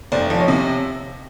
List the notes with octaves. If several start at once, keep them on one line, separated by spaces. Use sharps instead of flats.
F1 C5 D5
F3
C#5 D#5
C3